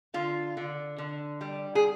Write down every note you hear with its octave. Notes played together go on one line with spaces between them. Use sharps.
D3 F4
D3
D3
G3
G#4